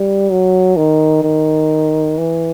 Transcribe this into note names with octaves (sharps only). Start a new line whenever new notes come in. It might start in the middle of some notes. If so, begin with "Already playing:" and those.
Already playing: G3
F#3
D#3
D#3
E3